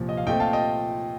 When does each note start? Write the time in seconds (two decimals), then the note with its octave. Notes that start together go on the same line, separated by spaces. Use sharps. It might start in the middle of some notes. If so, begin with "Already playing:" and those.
Already playing: C2 A#2 F3
0.09 D#5
0.17 F5
0.27 A#2 A3 C4 D#5 G5
0.40 F5 A5
0.53 D#5 G5